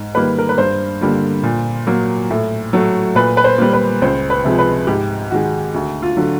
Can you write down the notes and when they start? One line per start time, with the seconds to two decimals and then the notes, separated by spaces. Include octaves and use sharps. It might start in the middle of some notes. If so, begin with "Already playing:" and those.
Already playing: G#2
0.15 D#3 G3 A#3 B4
0.39 A#4
0.49 B4
0.58 G2 C5
1.01 D3 G3 A#3
1.43 A#2
1.87 F#3 A#3
2.30 A2
2.73 F#3 A3
3.15 A#2 B4
3.37 B4
3.44 C5
3.58 G3 A#3
3.73 B4
4.02 C#2 C5
4.30 B4
4.44 C3 F3 G#3
4.59 B4
4.87 G#2 G4
5.31 D#3 G#3 F#4
5.74 D2 F#4
6.02 F4
6.17 D3 F#3